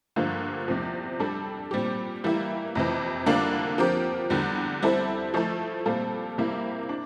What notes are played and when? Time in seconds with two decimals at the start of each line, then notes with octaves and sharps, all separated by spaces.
0.16 G2 D3 F3 A#3 F4
0.68 E2 C3 F3
1.20 G3 D4 A4
1.71 A#2 G3 C4 G4
2.24 E3 G3 A#3 E4
2.75 F2 C3 E3
3.26 D3 G3 A#3 D4 F4
3.78 F3 C4 G4 A#4
4.30 E2 D3 G3
4.83 G3 C4 E4 A4 C5
5.34 F3 A3 E4 A4
5.85 A#2 G3 C4 F4 A4
6.38 C3 G3 A#3 E4
6.89 D4